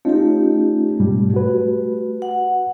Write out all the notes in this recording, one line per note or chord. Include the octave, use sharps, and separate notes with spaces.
A3 C#4 D#4 F4 G4
G#2 B2 G3
F#4 B4
F#5